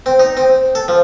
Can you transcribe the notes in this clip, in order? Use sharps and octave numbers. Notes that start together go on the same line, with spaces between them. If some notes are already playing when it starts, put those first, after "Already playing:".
C4
D#4
C4
A4
F3